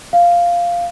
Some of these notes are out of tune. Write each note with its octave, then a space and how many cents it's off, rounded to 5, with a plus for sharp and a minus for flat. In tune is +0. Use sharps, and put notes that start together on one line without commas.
F5 -5